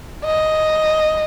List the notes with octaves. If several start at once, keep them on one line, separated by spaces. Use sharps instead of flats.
D#5